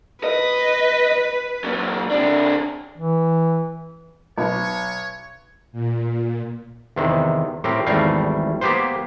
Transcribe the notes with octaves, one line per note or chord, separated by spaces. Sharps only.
B4 D#5
A#2 F#3
C3 D4
E3
B1 C#5
A#2
E2 C3 D#3
A2 C4 G4 A#4
G#1 E2 G3 A3 A#4 F5
A#3 B3 G4 B4 C5